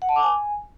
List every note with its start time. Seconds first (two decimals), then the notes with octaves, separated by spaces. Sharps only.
0.02 F#5
0.09 A5
0.16 D6
0.23 G#5